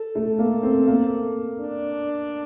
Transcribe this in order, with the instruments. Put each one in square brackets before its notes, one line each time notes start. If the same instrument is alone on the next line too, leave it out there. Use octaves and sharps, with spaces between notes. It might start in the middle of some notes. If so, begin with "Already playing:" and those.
Already playing: [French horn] A4
[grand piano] A3
A#3
C4
A#3
[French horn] D4